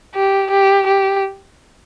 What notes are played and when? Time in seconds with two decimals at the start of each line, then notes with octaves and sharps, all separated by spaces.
0.15 G4
0.51 G4
0.87 G4